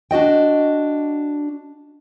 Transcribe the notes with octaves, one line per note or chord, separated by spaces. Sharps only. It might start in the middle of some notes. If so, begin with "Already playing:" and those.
D4 F#4 D#5 G5